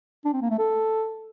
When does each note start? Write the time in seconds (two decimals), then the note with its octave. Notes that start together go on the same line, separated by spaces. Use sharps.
0.25 D4
0.33 C4
0.42 A#3
0.50 A3
0.59 A4